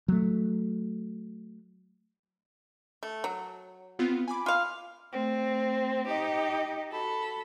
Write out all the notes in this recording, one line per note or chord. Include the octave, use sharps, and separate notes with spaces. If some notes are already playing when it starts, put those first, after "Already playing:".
F#3 A3
A3
F#3
B3 C4 F4
G#5 B5 D6
F4 F5
A3 C4
D#4 G4 D#5
F#4 A4 B5